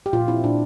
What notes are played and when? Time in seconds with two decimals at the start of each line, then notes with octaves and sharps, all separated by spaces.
0.06 G4
0.13 A#2 F4
0.28 C4 E4
0.44 A#2 D4